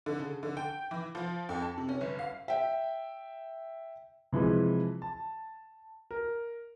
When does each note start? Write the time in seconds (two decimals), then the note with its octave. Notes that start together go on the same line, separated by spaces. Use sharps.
0.06 D3
0.19 C#3
0.43 D3
0.57 G5
0.91 E3
1.15 F3
1.49 F2
1.62 A5
1.78 C3
1.89 C#4
2.01 G1
2.19 F5
2.48 E5 G5
4.33 C3 E3 F3 G#3
5.02 A5
6.11 A#4